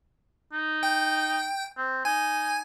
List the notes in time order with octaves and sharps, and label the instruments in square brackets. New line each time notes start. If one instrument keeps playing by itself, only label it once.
[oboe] D#4
[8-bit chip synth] G5
[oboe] C4
[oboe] D#4 [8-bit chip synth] G#5